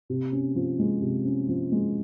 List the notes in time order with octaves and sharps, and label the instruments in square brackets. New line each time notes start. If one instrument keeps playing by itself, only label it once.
[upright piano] C3
C#4
F3
G#3
C3
C#4
F3
G#3